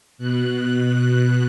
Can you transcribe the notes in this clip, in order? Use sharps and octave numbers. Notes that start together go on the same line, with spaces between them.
B2 F#6